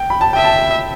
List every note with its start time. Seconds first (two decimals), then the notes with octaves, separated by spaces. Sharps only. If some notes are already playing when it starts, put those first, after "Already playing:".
Already playing: G5
0.10 B5
0.21 A5
0.33 E5 G5
0.44 A5